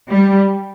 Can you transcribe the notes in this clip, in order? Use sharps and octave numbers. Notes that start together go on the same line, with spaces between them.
G3